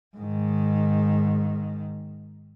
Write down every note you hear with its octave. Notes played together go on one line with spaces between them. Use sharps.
G#2 D#3